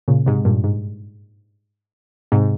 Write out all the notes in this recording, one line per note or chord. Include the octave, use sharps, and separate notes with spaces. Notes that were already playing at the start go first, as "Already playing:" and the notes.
A#2 C#3
G#2 C3
G2 A#2
G#2
G#2 C3